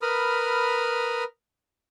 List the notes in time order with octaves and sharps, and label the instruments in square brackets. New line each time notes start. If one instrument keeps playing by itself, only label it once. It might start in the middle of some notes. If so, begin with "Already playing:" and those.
[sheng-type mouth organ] A#4 B4 B5 D#6 F6